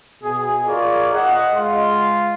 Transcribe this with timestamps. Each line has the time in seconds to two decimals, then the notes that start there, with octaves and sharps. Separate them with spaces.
0.23 B2 G#4
0.65 F4 G#4 A#4 C#5 D5
1.13 D#5 F#5
1.53 G#3 F4